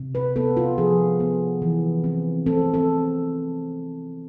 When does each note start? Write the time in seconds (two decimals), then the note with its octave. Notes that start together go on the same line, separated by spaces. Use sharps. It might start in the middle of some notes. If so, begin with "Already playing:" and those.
Already playing: C3
0.15 B4
0.36 B3 A4
0.57 F4
0.78 F3 G#4
1.20 B3
1.62 E3
2.04 C4
2.46 C4 A4
2.74 A4